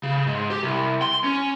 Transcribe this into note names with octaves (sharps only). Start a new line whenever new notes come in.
C#3
G#2
G4
C2
C6
C#4